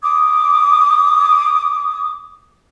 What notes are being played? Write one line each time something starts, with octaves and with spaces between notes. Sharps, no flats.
D6 D#6